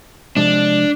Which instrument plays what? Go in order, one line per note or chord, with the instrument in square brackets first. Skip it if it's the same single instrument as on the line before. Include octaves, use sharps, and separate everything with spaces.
[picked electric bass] C3 F3 G#3 [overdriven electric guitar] D4